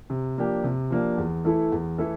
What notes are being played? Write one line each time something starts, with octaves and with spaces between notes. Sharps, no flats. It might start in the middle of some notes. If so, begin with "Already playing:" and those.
C3
F3 A#3 D4 G4
C3
F3 A#3 D4 G4
E2
E3 A3 E4 A4
E2
E3 A3 E4 A4